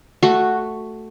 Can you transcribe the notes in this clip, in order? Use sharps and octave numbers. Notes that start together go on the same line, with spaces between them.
A3 F#4